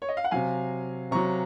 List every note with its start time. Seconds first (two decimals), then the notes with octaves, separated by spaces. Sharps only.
0.02 C#5
0.09 D#5
0.17 F5
0.24 F#5
0.31 C3 F#3 F5 G#5
1.11 C3 F#3 A#5 C#6